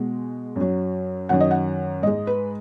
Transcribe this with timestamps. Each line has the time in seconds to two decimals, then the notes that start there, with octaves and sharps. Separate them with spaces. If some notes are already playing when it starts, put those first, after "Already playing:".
Already playing: B2 G#3
0.56 F#2
0.61 F#3
1.29 F#2 D#3 F#3 F#5
1.40 D#5
1.51 F#5
2.02 G#2 G#3 D#5
2.27 B4